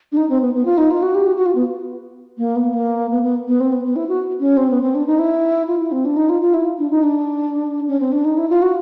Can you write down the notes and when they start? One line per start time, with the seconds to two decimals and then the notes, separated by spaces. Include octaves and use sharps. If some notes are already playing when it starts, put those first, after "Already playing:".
0.12 D4
0.17 D#4
0.29 C4
0.41 B3
0.54 B3
0.65 F4
0.78 D#4
0.91 F4
1.02 F#4
1.15 G4
1.26 F#4
1.37 F#4
1.46 F4
1.55 B3
2.38 A#3
2.56 B3
2.74 A#3
3.11 B3
3.23 B3
3.48 B3
3.60 C4
3.72 B3
3.84 B3
3.96 E4
4.09 F#4
4.40 C#4
4.57 C4
4.70 B3
4.82 C4
4.95 D4
5.07 D#4
5.19 E4
5.67 F4
5.80 E4
5.92 C4
6.05 D4
6.17 D#4
6.29 F4
6.42 F4
6.54 E4
6.78 D4
6.90 D#4
7.03 D4
7.88 C#4
8.00 C4
8.12 D4
8.25 D#4
8.38 E4
8.50 F4
8.62 F#4